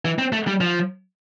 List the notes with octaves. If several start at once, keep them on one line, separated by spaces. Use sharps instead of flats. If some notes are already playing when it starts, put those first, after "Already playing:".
E3
C4
A3
G3
F3